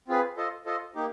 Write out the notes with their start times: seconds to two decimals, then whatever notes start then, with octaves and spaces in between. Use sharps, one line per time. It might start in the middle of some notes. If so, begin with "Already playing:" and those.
0.08 C4 F4 G#4 B4
0.37 F4 A4 C5 D#5
0.66 F4 A4 C5 D#5
0.95 A#3 D#4 G4